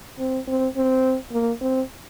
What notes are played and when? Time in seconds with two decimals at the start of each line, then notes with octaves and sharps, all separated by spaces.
0.19 C4
0.47 C4
0.76 C4
1.32 A#3
1.61 C4